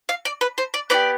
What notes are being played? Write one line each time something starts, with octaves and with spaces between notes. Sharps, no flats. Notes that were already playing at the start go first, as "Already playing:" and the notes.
F5
D5
B4
C5
D5
B3 D#4 G4 D5